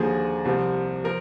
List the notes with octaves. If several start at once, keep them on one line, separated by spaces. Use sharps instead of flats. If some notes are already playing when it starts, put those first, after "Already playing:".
Already playing: D#2 D3 F3 G#4
C2 C3 F3
F3 A#4